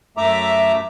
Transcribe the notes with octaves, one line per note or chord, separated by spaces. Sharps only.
F#2 A3 E5 A#5 D6